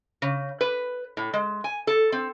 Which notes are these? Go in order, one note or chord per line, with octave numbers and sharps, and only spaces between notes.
C#3
B4
A2
G#3
G#5
A4
C4